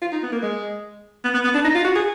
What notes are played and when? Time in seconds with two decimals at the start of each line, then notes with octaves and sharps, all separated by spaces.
0.01 F4
0.12 D#4
0.23 B3
0.33 A#3
0.43 G#3
1.24 B3
1.34 B3
1.44 B3
1.55 D4
1.65 D#4
1.75 F4
1.85 F#4
1.96 G#4